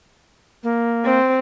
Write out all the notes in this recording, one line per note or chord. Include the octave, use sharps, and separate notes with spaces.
A#3
C4